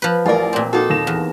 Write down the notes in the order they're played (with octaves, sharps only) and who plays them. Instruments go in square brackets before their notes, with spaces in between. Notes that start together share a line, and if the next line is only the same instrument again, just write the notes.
[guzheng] F3 B4
[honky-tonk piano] A1 D5 [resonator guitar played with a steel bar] F4 A#4
[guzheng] A#2 C4
[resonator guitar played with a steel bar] A#3 D#4 A4 [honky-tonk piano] F#4
[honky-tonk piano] D#2 A#6 E7
[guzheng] E2